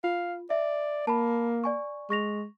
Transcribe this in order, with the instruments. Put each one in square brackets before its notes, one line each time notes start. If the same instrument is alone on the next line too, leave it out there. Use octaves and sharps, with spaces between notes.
[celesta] F4 [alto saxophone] F5
[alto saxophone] D5 [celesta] E5
[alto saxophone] A#3 [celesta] A5 B5
[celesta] D5 G#5 C#6
[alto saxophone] G#3 [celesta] C#6 A#6 F7